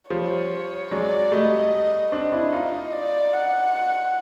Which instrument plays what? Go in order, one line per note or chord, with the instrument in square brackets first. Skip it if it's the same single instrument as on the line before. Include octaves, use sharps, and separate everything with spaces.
[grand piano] F3 G3 [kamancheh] C#5
[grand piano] F#3 G#3 [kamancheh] D5
[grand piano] G3 A3 [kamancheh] D#5
[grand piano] C4 D4 [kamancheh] D#5
[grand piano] D4 E4
D#4 F4
[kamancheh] D5
F#5